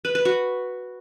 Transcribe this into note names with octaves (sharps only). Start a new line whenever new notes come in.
B4
B4
F#4